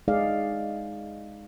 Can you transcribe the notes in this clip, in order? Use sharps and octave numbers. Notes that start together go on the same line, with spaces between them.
G#3 D#4 G#4 D5 F5